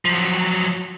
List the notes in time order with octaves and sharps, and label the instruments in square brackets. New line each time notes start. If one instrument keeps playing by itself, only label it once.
[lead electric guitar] F3 F#3